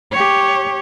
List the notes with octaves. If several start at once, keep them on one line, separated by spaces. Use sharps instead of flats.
G4 C#5